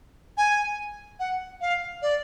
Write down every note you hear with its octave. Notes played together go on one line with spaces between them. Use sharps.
G#5
F#5
F5
D5